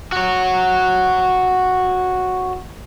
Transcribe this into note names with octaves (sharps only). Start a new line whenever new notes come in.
F#4 C#5